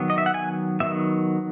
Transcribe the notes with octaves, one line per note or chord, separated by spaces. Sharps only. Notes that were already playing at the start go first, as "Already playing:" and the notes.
Already playing: D#3 F#3 B3
D#5
E5
F#5
G#5
D#3 F#3 B3 E5